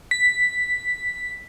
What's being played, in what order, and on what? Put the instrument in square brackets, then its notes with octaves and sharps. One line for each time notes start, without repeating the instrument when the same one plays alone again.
[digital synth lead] B6